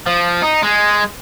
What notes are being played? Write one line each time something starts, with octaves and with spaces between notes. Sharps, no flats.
F3
D#4
G#3